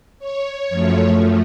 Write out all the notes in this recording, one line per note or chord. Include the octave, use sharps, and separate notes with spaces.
C#5
F#2 F3 A3